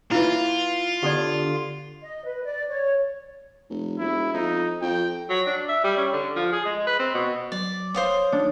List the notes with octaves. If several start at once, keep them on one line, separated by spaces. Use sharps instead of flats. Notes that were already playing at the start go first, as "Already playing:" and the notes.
A#2 E3 E4 F4 B4
D3 B3 D4 G4 A4 D5
D#5
B4
D5
C#5
F1
E1 E4
F2 D#4
F2 G5
F#3
D4
E5
G3
C#4
D3
F3
G#4
G#3
B4
C4
B2
F#3 D5
D1 C5 C#5 F5 D#6
E3 D4 D#4 C#5